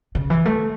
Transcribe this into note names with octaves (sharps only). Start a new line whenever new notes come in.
C#3
E3
A3